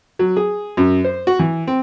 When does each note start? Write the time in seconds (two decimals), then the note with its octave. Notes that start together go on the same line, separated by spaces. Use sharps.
0.19 F#3
0.37 G#4
0.77 F#2
1.04 C5
1.27 F#4
1.39 E3
1.67 C4